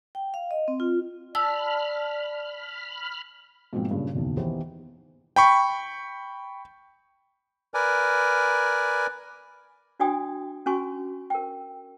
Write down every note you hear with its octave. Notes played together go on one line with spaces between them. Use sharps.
G5
F5
D#5
C4
F4
D5 A5 B5 E6 F6
G#2 B2 F3 A#3 C4
G2 A#2 C#3
F#1 B1 E2 D#3
D#3 E3 B3 G4 C5
G5 B5 C#6
A#4 B4 D5 G#5
D4 F#4 D5 G5 G#5 D#6
C#4 F#4 G#5 C#6
A#4 G5